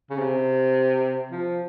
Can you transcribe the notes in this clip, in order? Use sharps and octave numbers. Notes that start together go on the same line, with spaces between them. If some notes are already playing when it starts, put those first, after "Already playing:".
C#3
C3
F3